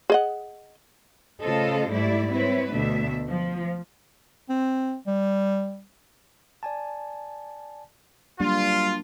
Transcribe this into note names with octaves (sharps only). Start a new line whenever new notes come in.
G#4 D#5 F#5
C#3 A3 F4 A4 C5 D#5
G#2 G3 A3 E4 D5
C4 E4 B4 C#5
D2 B2 A3 D4 E5
F3
C4
G3
D5 G#5 A5
F#3 G3 A#3 D4 F4